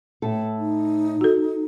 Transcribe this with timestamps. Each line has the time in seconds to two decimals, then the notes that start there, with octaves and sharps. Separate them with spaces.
0.22 A2 A4
0.58 D#4
1.21 F#4 A4